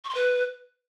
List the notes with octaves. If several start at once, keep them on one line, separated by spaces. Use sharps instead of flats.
C#6
C6
B4